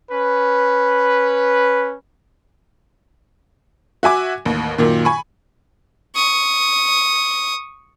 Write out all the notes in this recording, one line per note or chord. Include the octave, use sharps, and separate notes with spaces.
C#4 B4
F#4 E5 G#5 D6
A1 D#2
F#2 A#2 D#3
G#5 B5 C#6
C#6 D#6